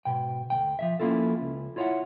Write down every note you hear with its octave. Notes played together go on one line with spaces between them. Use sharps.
G#2 B2 G5
D2 F3 G5
F3 F#3 E5
F3 A#3 C#4 E4 F4 A4
C#2
E4 F4 C#5 D#5 E5 F#5